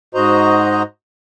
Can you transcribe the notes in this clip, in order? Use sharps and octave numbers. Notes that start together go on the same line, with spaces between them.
G#2 F#4 C5 D#5 A#5